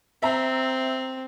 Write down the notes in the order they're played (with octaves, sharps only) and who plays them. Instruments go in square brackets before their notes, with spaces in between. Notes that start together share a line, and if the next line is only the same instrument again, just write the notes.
[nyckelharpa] C4 [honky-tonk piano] E5 A#5